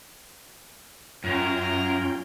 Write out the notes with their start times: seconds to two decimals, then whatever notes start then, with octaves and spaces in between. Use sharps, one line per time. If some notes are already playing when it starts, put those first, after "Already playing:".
1.24 F#2 C#4 F4 G#4 A#4 G5 A#5